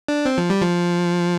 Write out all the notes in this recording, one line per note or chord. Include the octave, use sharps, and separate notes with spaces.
D4
C4
F3
G3
F3